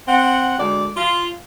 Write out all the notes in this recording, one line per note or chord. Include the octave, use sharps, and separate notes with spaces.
C4 F#5
D2 G#3 D5
F4